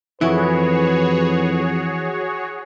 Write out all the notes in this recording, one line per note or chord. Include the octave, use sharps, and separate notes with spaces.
F2 E3 E4 F#4 G#4 B4 C#5